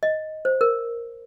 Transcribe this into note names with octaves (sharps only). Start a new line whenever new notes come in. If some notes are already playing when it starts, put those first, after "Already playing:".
D#5
C5
A#4